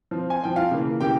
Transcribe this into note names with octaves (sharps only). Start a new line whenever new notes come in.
F3 C4
G#5
F3 C4 G5
F4 F5
C#3 E3 A#3
C#3 E3 A#3 G4 G5